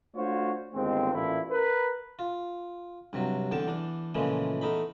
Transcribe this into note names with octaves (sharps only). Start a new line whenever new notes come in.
A3 D4 F4 F#4 C5 C#5
G1 D#2 G#3 C4
A1 A#2 A3 E4
A#4 B4
F4
G2 C3 F#3
E2 D3 G5 A5
E2 D4
A#2 C#3 E3 F3 G#3 A3
E2 A3 D#4 B5